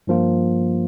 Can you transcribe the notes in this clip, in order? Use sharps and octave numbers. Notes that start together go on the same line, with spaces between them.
G2 F3 A#3 F4